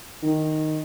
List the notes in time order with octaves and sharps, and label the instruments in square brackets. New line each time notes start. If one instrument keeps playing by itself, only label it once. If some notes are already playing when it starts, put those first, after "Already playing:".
[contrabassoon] D#3